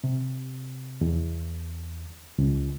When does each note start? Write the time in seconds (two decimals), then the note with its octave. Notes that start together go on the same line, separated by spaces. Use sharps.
0.04 C3
1.01 E2
2.38 C#2